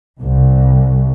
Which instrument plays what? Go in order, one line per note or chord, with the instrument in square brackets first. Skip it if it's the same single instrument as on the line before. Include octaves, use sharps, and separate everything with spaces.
[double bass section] C2